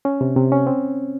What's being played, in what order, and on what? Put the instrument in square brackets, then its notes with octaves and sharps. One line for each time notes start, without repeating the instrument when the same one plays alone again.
[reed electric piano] C#4
C3
C3
C#4
C4